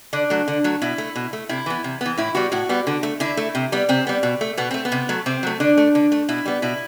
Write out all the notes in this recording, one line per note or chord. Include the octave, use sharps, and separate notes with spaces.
D3 D4
F#3 A3
D3
F#3 A3
B2 E4
A3
B2
A3
C3 E4
E3 B3
C3
E3 B3
A2 E4
G3 B3 F#4
A2 F#4
G3 B3
D3
A3
D3 E4
A3
C3
G3 B3
C3 C4
G3 B3
B2
A3
B2 B3
A3 C4
B3
C3
F#3 A3
C3 C4
F#3 A3
D3 D4
A3
D3
A3
B2 E4
G3 B3
B2 E4